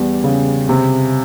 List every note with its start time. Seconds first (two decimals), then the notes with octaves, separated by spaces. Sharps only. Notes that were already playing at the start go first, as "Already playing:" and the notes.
Already playing: E2 G3
0.24 C#3
0.69 C3